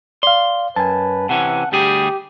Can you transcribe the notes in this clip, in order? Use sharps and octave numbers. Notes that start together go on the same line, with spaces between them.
D5 F5 C6
F#2 B4 G#5 A5
C3 E3 C#4 F#5
D2 G3 G4 G#4